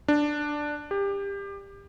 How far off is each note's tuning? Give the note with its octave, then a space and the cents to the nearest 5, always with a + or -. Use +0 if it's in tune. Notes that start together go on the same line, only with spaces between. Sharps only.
D4 +5
G4 +25